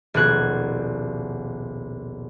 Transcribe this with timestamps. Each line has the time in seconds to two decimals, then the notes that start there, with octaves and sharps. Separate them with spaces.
0.14 D#1 A#1 B2 F#6 G#6